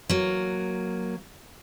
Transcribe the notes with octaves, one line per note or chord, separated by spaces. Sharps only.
F#3 A#3